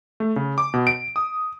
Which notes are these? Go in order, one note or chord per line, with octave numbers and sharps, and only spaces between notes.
A3
C#3
D6
B2
D7
D#6